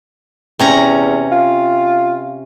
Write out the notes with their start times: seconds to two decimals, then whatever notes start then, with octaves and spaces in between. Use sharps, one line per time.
0.59 E2 C3 C#4 A#5
1.32 F4